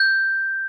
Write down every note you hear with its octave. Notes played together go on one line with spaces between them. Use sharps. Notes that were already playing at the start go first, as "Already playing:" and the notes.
Already playing: G6